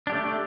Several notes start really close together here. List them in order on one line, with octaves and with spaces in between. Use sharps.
D4 G4 A3